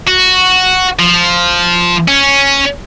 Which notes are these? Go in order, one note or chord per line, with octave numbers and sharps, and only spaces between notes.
F#4
F3
C#4